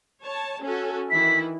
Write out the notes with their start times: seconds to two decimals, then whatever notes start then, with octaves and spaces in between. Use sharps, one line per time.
0.21 C#5 A5
0.62 C#4 F#4 A4
1.11 D#3 E3 E4 B6